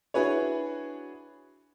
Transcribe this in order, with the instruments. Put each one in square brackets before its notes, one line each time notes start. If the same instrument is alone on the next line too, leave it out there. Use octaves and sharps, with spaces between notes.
[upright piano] D4 E4 F#4 G#4 B4 C#5